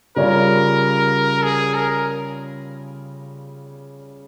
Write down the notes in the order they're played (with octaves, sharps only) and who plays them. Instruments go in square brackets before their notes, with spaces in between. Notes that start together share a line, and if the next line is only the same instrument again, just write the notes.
[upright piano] C#3 G3 C#4 F4 [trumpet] A#4
[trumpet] G#4
A#4